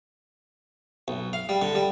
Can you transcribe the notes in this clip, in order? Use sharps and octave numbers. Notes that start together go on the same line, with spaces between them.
B1
F5
G3
D3
G3